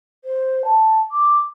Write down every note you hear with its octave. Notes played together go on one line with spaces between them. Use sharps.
C5
A5
D6